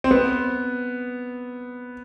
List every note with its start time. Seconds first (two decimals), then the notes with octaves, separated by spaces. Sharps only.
0.04 C4
0.11 B3